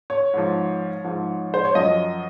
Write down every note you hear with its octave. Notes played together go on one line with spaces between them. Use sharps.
C#5
G#2 F3
G#2 F3
C5
C#5
F#2 F3 D#5